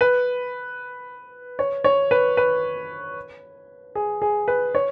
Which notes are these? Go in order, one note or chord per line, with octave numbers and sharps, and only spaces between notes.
B4
C#5
C#5
B4
B4
G#4
G#4
B4
C#5